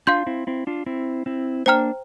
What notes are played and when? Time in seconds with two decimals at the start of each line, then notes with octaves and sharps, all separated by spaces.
0.07 D4 F4 F5 C6 G6
0.27 C4 E4
0.47 C4 E4
0.67 D4 F4
0.86 C4 E4
1.26 C4 E4
1.66 A#3 D4 C5 G5 A#5 F6